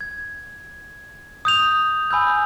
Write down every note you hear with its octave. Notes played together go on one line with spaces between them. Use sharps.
G#6
D#6 G6 F7
G#5 B5 E6 G6